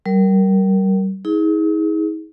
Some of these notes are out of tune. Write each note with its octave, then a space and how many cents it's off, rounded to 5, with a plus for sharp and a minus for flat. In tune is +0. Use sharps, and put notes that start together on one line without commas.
G3 -30 A#4 +0
D#4 +45 G#4 +0